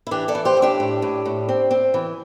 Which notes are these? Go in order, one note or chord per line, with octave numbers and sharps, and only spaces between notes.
E4
E3 D4 G4
A4 D5
E3
G4 C5
A2
D4 G4
A2
A2
A2
C4
C4
E3